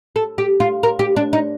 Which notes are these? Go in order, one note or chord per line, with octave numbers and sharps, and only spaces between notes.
A4
G4
F4
A#4
G4
D4
D#4